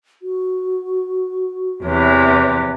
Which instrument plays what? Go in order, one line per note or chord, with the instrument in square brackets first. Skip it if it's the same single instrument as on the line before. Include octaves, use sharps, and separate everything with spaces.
[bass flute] F#4
[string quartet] E2 C3 E3 [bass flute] C#5